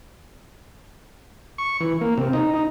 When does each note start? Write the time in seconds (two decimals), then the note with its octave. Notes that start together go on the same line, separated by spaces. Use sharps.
1.58 C#6
1.80 E3
2.01 A#3
2.18 C3
2.33 D#4
2.54 D#4